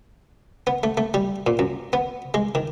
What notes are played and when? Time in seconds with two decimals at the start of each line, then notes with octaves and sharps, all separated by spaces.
0.67 B3
0.83 A3
0.97 A3
1.14 G3
1.47 A#2
1.59 F#2
1.93 B3
2.34 G#3
2.55 D#3